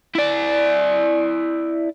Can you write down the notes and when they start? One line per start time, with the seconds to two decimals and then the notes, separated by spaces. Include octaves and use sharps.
0.15 E4 D5